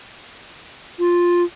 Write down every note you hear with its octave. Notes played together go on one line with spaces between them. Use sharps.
F4